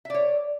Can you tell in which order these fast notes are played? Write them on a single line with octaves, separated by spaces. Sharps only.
E5 D5 C#5